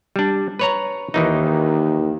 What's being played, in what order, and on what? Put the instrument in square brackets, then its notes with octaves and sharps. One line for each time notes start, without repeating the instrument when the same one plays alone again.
[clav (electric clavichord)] G3 D4
B4 C#5 A#5
[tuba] D#2 [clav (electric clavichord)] D#3 E3 D#4